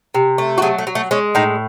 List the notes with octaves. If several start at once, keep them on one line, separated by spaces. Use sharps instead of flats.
C3
A3
F#4
F#3 G#4
A3
F#3
A3
G#3 C#4
A2 D#4